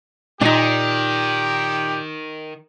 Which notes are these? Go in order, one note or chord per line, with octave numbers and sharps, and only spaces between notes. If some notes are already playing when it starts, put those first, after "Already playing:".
A#2 D#3 D4 D#4 G4